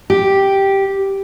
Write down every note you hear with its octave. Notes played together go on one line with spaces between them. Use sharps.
G4